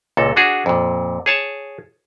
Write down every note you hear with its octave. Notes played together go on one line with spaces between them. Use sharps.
C#2 A#2 A4
D4 F#4 G#4
F2 A#2
G#4 C#5 A5